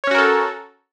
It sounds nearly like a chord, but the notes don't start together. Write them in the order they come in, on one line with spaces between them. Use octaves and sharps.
C#5 C#4 F#4 A#4 A4